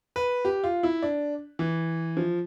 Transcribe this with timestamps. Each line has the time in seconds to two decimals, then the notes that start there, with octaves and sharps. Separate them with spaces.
0.16 B4
0.45 G4
0.64 F4
0.83 E4
1.02 D4
1.59 E3
2.17 F3